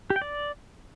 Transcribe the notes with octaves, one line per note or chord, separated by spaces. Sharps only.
G4
G5
D5